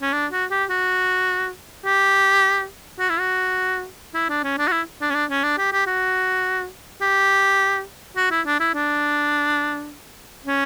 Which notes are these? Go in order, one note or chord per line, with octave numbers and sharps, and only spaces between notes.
C#4
D4
F#4
G4
F#4
G4
F#4
E4
F#4
E4
D4
C#4
D4
F#4
E4
D4
C#4
D4
C#4
D4
G4
G4
F#4
G4
F#4
E4
D4
E4
D4
C#4